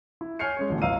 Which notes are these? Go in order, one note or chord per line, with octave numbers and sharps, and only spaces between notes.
E4
C#5 G#5 F6 G6 C7 C#7
G#3 C#4 C#5
A1 B2 D3
G1 D#5 F5 A#5 E6 D#7